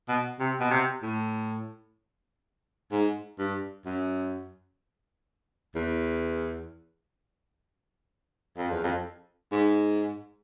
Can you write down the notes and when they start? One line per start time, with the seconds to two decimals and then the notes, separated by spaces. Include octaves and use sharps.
0.09 B2
0.40 C3
0.60 B2
0.71 C3
1.03 A2
2.92 G#2
3.39 G2
3.86 F#2
5.75 E2
8.58 F2
8.71 E2
8.84 F2
9.52 G#2